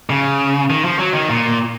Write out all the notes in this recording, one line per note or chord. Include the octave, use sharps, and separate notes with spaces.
C#3
D#3
F3
F#3
D#3
A#2